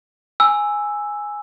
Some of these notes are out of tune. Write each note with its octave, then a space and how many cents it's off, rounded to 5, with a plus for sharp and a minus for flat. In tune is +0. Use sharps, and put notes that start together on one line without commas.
G#5 +0 B5 +0 E6 +0